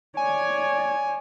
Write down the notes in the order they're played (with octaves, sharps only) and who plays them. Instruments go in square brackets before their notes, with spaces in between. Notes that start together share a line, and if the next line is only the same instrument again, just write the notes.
[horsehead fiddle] C#5 D5 [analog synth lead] G#5